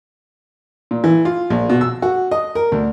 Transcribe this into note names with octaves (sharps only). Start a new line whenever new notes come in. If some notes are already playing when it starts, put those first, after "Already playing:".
A#2
E3
F4
A#1
B2
E6
F#4
D#5
A#4
D2